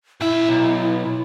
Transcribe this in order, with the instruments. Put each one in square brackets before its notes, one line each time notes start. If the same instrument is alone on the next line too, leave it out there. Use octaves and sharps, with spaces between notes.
[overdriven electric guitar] A#2 E5 [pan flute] E4
[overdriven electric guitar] B1